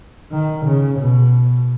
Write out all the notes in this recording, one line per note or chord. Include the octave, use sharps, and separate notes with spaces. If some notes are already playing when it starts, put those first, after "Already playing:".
D#3
C#3
B2